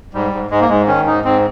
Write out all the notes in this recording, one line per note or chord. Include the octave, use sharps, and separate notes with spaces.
G#2 G3
G#2
G#2 G#3
A#3
G#2 G#3
D#3 C#4
G#2 D#4
G#2 C4